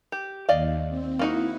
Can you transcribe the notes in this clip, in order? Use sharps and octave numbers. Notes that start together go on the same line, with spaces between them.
G4
D#2 D5 D#5 F5
C4
A#3 D#4 E4 F#4